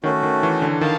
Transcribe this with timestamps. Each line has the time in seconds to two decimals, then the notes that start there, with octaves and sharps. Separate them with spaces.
0.04 D#3 A3 C#4 F#4
0.23 D#3
0.43 E3
0.62 D3
0.81 D#3 F5 A5